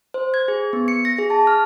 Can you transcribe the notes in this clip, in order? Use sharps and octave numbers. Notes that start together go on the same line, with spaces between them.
C5
G#6
G#4
B3
C#7
A#6
G#4
A5
F6